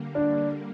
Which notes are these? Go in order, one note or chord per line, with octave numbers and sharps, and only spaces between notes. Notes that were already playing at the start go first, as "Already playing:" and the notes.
Already playing: D3 G3 A#3
D4